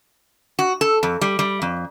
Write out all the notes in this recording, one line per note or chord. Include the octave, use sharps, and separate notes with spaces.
F#4
A4
F2
G3
G3
F2